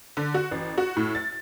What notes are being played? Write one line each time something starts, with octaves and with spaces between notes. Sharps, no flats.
D3
F#4
A1
F#4
A2
A6